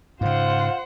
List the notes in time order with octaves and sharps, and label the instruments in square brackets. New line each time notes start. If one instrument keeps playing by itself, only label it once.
[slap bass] G#2 C#3 [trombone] F4 [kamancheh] C5 F#5